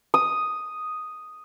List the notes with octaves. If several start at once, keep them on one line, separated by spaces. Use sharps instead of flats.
D#6